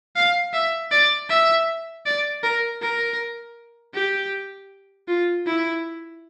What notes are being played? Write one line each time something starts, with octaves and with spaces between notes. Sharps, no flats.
F5
E5
D5
E5
D5
A#4
A#4
G4
F4
E4